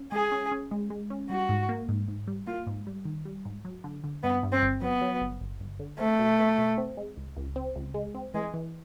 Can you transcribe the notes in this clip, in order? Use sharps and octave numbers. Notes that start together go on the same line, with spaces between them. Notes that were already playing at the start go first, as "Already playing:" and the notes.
Already playing: C#4
G#3 G#4
C#4
C#4
G#3
G#3
C#4
G3 F#4
G#2
A#3
G#2
G#2
G3
A#3 F4
G#2
G3
D#3
G3
G#2
F#3
D3
D3
G2 B3
G2
C4
G1
F#3 B3
F#3
G1
G1
G1
D3
A3 C4
B2
B2
B2
C4
G#3
C#2
C#2
C4
C#2
G#3
C4
E3 G#3
E3